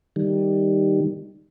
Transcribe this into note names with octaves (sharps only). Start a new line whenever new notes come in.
D#3 G3